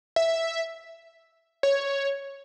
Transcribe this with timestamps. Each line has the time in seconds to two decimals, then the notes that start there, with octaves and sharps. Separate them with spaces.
0.16 E5
1.63 C#5